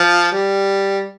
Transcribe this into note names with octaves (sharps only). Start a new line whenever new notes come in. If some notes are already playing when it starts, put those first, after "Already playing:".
Already playing: F3
G3